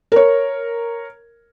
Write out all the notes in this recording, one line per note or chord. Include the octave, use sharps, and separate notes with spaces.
A#4 C#5